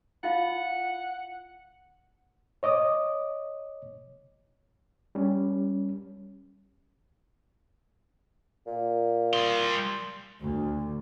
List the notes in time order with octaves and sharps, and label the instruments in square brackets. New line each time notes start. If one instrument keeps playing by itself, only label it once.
[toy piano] E4 F4 F5 [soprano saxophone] F#5
[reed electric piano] C#5 D#5 D6 D#6
G3 C#4
[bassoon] A#2
[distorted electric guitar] G3 C6
[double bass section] D2